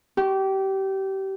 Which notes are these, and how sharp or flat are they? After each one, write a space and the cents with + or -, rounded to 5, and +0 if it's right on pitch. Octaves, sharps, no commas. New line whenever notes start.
G4 -25